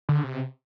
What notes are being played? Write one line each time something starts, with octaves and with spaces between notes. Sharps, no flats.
D3
C3